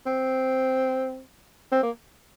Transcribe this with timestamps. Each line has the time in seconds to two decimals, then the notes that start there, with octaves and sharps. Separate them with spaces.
0.06 C4
1.72 C4
1.83 A#3